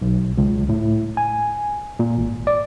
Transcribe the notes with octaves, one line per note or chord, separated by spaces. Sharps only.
B1
C#2
A2
G#5
A#2
G#1
D5